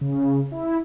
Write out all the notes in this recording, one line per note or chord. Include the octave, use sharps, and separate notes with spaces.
C#3
E4